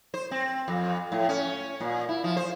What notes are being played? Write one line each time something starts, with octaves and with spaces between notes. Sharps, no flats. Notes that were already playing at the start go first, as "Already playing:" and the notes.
C5
C4
F2
A2
C#4
A#2
E4
F3
C5